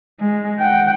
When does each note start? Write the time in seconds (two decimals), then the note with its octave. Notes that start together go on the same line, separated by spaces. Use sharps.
0.20 G#3
0.59 F#5 G5